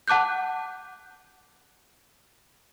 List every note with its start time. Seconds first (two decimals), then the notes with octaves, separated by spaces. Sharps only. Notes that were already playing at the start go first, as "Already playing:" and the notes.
0.08 F#5 A5 D6 F#6 G6